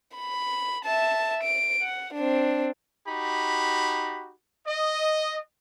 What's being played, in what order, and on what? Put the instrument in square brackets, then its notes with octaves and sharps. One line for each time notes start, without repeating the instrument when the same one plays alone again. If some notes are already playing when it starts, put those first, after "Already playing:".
[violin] B5
E5 A5
D7
F#5
C4 D4
[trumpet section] D#4 F#4 G4 B5
D#5